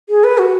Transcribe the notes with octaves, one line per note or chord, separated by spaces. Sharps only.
G#4
B4
F#4